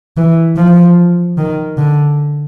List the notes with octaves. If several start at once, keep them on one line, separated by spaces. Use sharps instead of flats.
E3
F3
D#3
D3